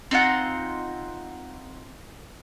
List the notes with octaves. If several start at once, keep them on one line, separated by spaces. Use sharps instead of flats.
C4 D#4 F4 F#5